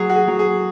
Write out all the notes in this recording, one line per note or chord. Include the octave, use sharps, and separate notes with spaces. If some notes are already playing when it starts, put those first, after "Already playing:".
Already playing: F#3 G#4
F#4
G#4
F#3
G#4